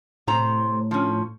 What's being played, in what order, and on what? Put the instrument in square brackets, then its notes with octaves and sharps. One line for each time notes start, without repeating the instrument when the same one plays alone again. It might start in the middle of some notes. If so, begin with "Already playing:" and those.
[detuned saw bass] A2 [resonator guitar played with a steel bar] C3 C5 A#5
[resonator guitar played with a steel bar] F3 C#4